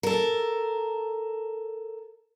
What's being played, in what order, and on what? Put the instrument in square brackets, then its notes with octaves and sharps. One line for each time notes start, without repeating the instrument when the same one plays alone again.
[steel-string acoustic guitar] A4 A#4